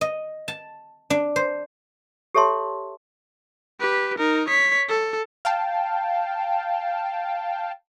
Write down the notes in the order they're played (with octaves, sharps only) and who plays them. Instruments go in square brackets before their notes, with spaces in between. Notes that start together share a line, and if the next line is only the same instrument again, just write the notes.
[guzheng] D#5
A5
D4
C5
[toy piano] G4 A4 C#5 E5 A5 C6
[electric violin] G4 B4
D#4 A#4
C#5 B6
A4
[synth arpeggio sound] F5 G5 A5